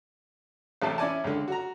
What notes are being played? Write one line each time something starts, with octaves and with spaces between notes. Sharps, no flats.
A1 A2 C3 A5
C#4 E4 D5 G#5 A5
C#2 D3
F#4 A#5